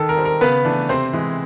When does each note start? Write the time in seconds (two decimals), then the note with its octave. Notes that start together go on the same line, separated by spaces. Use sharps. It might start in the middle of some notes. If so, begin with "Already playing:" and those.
Already playing: D#3 A4
0.09 A#4
0.17 G3 C4
0.25 A#4
0.41 C#3 B3 B4
0.65 E3 A3 D4
0.89 C3 C4 C5
1.13 E3 G#3